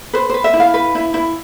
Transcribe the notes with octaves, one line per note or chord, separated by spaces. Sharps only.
B4 C5
B4 C5
E5
E4
F5
B4
E4
E4